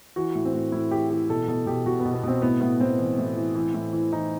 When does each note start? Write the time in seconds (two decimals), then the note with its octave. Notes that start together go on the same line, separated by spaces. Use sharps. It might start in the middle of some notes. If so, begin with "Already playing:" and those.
0.16 E3 F#4
0.35 A2
0.45 C4
0.53 A2
0.72 A2 E4
0.91 E3 G4
1.10 E3 G4
1.30 B2 A4
1.48 B2 A4
1.66 B2 G4
1.86 B2 F#4
2.00 B3
2.05 B2
2.14 B3
2.23 B2 C4
2.42 A2 B3
2.61 A2 B3
2.80 A2 C4
2.98 E3
3.18 A2
3.36 E3
3.55 E3
3.74 A2
3.93 E3
4.12 E3 D#4